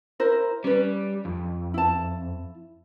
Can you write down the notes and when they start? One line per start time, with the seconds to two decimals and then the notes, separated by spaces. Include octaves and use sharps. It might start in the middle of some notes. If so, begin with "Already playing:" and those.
0.20 E4 A#4 C5
0.64 G3 C#4 B4
1.25 F2
1.74 E4 A5